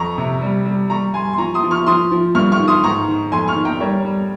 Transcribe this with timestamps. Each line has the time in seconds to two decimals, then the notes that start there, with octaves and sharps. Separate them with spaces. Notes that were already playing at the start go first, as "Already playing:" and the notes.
Already playing: F2 A#5 C#6
0.18 C3
0.42 G3
0.66 G3
0.90 G3 A#5 C#6
1.14 G3 G#5 C6
1.33 C6
1.38 F3 A#5 C#6
1.54 C6 D#6
1.63 F3
1.71 C#6 F6
1.86 F3 C6 D#6
2.11 F3
2.35 G2 C#6 F6
2.52 C#6 F6
2.60 D#3
2.68 C6 D#6
2.83 G#2 A#5 C#6
3.08 D#3
3.32 F2 G#5 C6
3.48 C#6 F6
3.56 D#3
3.65 G5 A#5
3.81 G3 A#4 C#5
4.05 G3